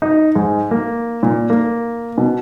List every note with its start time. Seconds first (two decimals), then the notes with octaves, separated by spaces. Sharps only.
0.02 D#4
0.35 G#2
0.71 A#3
1.23 A#2
1.50 A#3
2.18 B2